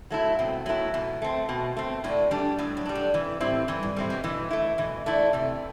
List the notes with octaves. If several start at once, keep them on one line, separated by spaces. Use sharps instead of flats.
F#3 A3 E4
B2 C4
F#3 A3 B3 E4
B2 E3
A3 C4
B2
A3 C4
A2 D3
E3 G3 D4
A2 F#3
F#3
G3 D4
D3
C3 E3
A2 G3 C4 E4
G2 E3
G2
A2 G3 C4 E4
B2
B2 E3
A3 E4
B2 E3
D3 A3 E4
C3 E3